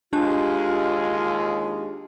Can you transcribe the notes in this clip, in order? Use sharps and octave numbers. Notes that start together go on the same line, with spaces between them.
D#2 G#3 D4 F4 G4 A5